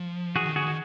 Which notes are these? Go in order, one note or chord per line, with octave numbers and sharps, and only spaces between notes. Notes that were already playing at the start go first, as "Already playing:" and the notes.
Already playing: F3
E3 F#4 G#4
D#3
D3 F#4 G#4
D#3